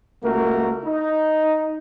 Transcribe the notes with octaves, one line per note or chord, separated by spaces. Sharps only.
C#2 A3 A#3 F#4 A#4
D#4